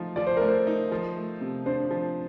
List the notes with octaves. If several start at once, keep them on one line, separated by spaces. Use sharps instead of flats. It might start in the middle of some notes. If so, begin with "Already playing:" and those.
Already playing: F3 A3 D#4
F3 D5
C5
A3 A#4
C5
D#4
F3
A3
C3
D4 C5
F3